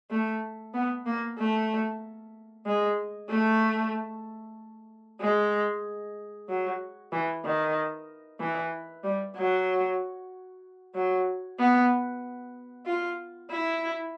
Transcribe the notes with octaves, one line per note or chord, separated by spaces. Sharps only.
A3
B3
A#3
A3
G#3
A3
G#3
F#3
E3
D#3
E3
G3
F#3
F#3
B3
F4
E4